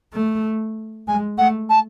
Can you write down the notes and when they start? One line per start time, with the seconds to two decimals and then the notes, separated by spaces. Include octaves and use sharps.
0.13 A3
1.08 G#3 G#5
1.38 A3 F#5
1.69 A5